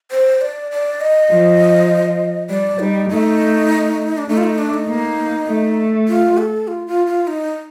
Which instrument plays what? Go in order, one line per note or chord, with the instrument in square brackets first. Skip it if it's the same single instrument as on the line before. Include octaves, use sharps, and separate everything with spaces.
[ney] C5
D5
D5
D#5
[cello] F3
[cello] G3 [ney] D5
[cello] G3 [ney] D#4
[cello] A3 [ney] D#4
[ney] D4
[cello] A3 [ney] D#4
[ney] F4
D#4
D4
D#4
[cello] A#3
A3
[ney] F4
A4
F4
F4
F4
D#4